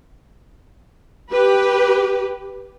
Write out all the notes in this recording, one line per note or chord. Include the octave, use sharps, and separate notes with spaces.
G4 B4